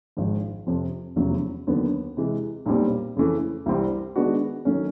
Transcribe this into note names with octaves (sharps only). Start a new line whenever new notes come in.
G#1 G#2 F3 G#3
F2 C3 F3
F1 E2 C#3 F#3
D#2 D3 F#3 B3
C3 E3 G#3
B1 A#2 G3 C4
F2 C#3 E3 A3
C2 C3 E3 G3 C4
D#3 G#3 B3 D4 F#4
D#3 F#3 A3 C#4